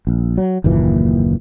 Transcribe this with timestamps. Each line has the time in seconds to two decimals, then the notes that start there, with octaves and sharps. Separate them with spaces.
0.07 A#1
0.38 F#3
0.64 F#1 D#2 A#2 E3